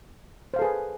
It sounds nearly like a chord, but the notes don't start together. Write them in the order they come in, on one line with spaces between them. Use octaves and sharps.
C5 F5 A4 G#4 B4